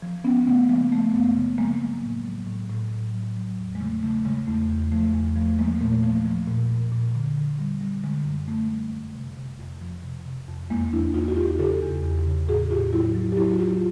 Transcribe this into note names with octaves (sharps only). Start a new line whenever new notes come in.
F3
F3 B3 C#4
C#3 A3 B3
F3 G#3 A#3
F3 A3
F#2 A3 B3
C#3
F3 G#3 A#3
F#3
A2
F#3
A2
A2
F#3
F#3
F#3
E2
G#3
C#3 A3
C#3 A3
C#3 G#3
E2 A3
E2
F3 A3
E2
F3 A3
F3 G#3 A#3
A#2 A3
F3 A3
F3
A#2
A#2
A#2
D3
D3
G3
G3
D3 G#3
F#2
F#2 A3
G3
F2
C3
C3
F2
F3
C3
C3
F2
E2 G#3 A#3
F3 D4 E4
E2 D#4 F4
F#4
E2 F4 G4
C#3 G4 A4
E2
E2
C#3
A2 F#4 G#4
A2 F4 G4
F#3 E4 F#4
F#3
G4
F#3 E4 F#4
F#4
F#3 F4 G4